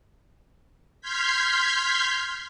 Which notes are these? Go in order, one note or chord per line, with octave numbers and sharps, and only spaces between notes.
C6 F6 G6 G#6 B6